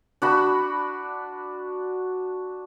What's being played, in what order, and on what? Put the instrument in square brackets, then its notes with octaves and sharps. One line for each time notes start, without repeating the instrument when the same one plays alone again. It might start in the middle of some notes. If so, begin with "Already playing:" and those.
[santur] D4 F#4 B5